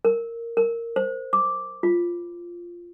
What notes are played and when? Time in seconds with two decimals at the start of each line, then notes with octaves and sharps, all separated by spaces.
0.05 A#4
0.57 A#4
0.96 C5
1.33 D6
1.83 F4